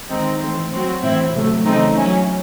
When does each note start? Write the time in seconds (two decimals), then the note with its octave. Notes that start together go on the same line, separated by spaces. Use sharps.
0.09 D#3 G#3 C4 D#4
0.40 E3 A3 C4
0.71 F#3 C4 F#4
1.02 A2 E3 C4 E4
1.33 C3 F#3 A3
1.65 C#3 E3 A3 C4 D#4
1.95 F#3 C#4 E4